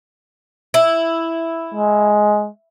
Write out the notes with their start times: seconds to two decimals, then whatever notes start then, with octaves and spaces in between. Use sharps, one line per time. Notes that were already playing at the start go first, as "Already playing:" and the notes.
0.74 E4
1.74 G#3